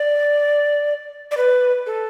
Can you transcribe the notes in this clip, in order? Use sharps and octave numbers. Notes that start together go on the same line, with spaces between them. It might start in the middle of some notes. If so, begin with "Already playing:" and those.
Already playing: D5
D5
B4
A4